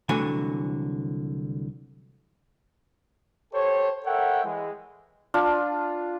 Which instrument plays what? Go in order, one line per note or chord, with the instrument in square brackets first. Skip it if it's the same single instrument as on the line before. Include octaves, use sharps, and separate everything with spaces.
[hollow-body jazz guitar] C2 D3 E3 F#3 A3 G#5
[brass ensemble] G4 A4 C5 C#5
A4 A#4 C#5 E5 F#5 G5
E3 G#3
[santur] D4 F4